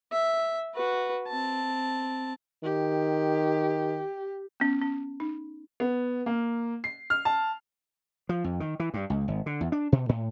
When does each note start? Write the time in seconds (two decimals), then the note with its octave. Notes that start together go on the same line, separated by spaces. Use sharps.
0.12 E5
0.74 F#4 B4
1.28 C4 A5
2.64 D#3 G4
4.60 B3 C#4
4.82 C#4
5.20 D#4
5.80 B3
6.26 A#3
6.84 C7
7.10 F6
7.25 A5
8.29 F3
8.44 F2
8.60 D#3
8.80 E3
8.94 G2
9.10 C#2
9.28 G#1
9.46 D3
9.61 E2
9.72 D4
9.92 B2
10.09 A2